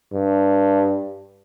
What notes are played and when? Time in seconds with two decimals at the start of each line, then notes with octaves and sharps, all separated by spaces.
0.13 G2